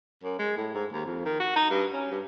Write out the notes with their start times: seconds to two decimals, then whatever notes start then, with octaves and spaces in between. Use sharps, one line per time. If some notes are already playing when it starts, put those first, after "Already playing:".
0.23 F#2
0.39 G#3
0.57 A2
0.75 G#2
0.92 D#2
1.06 F2
1.26 D#3
1.40 F#4
1.56 D#4
1.70 G2
1.93 C#4
2.12 G2